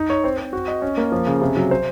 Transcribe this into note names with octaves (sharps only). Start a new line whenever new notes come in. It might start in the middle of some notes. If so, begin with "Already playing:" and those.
Already playing: D#4
C#5
C4
C4
F#4
D#5
C#4
A#3
F3
C#3
C3
F#3
C5